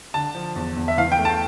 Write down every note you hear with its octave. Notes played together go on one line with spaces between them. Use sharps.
D3 A5
F3
E2
E2
E5
E3 F5
G5
A3
A5